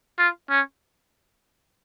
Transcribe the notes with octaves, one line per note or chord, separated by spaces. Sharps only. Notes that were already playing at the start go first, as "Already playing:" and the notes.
F4
C#4